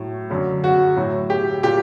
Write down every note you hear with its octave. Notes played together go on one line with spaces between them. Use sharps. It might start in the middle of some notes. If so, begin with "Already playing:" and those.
Already playing: A2 F#3
F#2 D3 F#3
F#4
A2 F#3
G4
A#2 G4